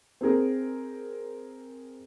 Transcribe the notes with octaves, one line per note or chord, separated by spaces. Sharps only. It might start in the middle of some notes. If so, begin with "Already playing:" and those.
C4 D#4 G#4 A#4